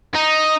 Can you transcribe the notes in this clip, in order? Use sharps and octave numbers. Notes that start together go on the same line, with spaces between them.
D#4